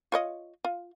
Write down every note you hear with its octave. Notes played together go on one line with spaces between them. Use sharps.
F4 C#5 D#5
F4